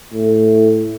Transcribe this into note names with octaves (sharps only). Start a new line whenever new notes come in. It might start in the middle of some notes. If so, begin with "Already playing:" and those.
A2